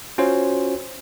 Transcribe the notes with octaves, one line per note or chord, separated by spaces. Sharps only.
C#4 F4 F#4 C5 C#5